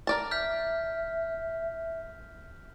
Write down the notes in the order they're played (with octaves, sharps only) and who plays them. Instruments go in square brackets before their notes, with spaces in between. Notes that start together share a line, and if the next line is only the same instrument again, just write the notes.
[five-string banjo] A#4 D5 A5
[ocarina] E5 [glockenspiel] F6 G6 B6